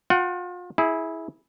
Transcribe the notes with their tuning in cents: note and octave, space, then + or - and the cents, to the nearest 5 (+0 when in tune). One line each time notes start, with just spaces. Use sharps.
F4 +35 F#5 +30
E4 -15 G#4 +5